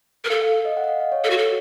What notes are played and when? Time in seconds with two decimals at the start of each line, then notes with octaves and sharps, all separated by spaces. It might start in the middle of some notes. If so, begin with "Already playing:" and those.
0.24 A#4
0.30 A4 F5
0.42 F5
0.53 F5
0.65 D#5
0.77 F#5
0.84 D#5
0.88 F5
1.00 F5
1.12 C#5
1.24 A4
1.30 F#4
1.38 A4